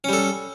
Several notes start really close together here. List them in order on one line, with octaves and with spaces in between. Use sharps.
C#4 G3 A4